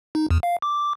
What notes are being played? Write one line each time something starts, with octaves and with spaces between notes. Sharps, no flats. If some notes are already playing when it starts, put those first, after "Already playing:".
D#4
E2
F5
D6